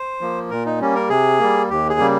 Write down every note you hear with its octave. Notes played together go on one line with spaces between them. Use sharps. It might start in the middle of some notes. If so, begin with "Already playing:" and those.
Already playing: C5
F3 A#3
A#2 A#4
D#4
G3 A#3 C#4
A#4
C3 G#4
G3 A#3
D#2 G4
G#4
C#3 G3 A#3